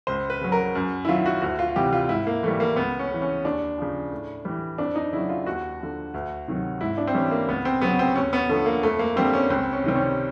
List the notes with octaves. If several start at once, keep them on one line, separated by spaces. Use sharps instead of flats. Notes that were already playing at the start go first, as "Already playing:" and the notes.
C#2 C5
B4
C#3 F#3
A#4
F#2
E4
D#3 F#3 F4
F#4
D2 F#4
F4
C3 E3 G3 G4
F4
G#2 E4
A#3
E3 G3 A3
A#3
C#2 B3
C#4
C#3 E3
C#4
D#2 D4
C#3 F3
A2
E3 G3
F2 D4
D#4
C#3 F#3 E4
F4
D#2 F#4
D3 F3
D2
C3 D#3 F#3
G#2 E4
D4
C4
E3 G3 C#4
A#3
C#2 B3
C4
C#3 F#3 B3
C4
D#2 C#4
B3
D3 F3 A3
A#3
F2 A3
A#3
D3 G3 C4
C#4
C#2 C4
C#4
C3 D#3 G3 C4
C#4